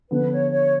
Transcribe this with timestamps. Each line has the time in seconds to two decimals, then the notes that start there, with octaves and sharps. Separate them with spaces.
0.11 D3 F3 B3 B4
0.32 C#5
0.52 C#5